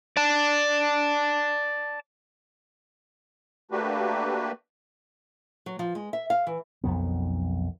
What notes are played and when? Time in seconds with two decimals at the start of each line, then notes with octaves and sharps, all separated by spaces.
0.17 D5 A5
3.71 A3 A#3 D4 F#4 G4 B4
5.66 F#3
5.79 F3
5.95 G#3
6.13 E5
6.30 F5
6.47 E3
6.84 B1 F2 D#3 B3